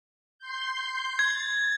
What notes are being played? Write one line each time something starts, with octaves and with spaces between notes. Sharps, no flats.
C6 G6
G#6 A6